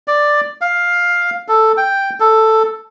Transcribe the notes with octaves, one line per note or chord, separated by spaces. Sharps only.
D5
F5
A4
G5
A4